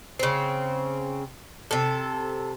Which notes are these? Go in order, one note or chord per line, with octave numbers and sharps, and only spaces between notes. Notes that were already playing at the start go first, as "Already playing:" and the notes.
C#3 C4
C3 A4